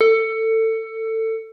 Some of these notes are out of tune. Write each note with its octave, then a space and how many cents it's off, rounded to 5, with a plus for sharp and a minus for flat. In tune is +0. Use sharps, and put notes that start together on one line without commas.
A4 +20